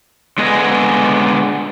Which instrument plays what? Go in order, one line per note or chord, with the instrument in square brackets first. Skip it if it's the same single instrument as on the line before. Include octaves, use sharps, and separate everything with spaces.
[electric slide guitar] D3 G#3 B3 G#4 D#5